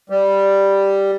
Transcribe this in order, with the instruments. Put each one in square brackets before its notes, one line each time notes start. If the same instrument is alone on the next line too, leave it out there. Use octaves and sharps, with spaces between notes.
[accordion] G3